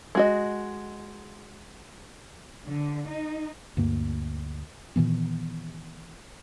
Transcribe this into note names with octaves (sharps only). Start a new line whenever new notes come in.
G#3 F#4 D#5
D3
D#4
D2 G2 A#3
A#2 D#3 E3 B3